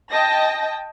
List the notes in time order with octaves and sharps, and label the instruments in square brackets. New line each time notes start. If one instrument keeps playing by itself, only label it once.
[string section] D#5 G5 A5 A#6